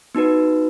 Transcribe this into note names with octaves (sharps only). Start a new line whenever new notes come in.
B3 D#4 F#4 B4